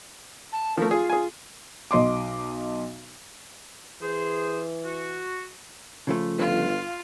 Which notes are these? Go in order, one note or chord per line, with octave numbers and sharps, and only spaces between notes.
A5
F3 A3 A#4
F4 G#4
G#4 G#5
B1 D#5 C6 D6
E3 G#4 C5
F#4
C#3 F3 A3
G1 F4